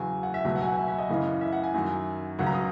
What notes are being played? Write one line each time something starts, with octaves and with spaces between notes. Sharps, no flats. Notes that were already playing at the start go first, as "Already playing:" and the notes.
Already playing: E2 C#3 F#3 G#5
F#5
E5
C#2 B2 F#3 E5
F#5
G#5
F#5
E5
E5
D#5
F#2 C#3 E3
E5
F#5
G#5
F#2 D#3 F#3
C#2 C#3 F#3 F#5
A#5
D#6